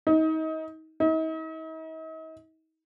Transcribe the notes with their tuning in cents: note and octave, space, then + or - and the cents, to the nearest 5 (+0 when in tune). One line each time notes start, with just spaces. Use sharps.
D#4 +30
D#4 +45